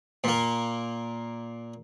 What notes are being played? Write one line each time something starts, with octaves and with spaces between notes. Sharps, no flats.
A#2 A#3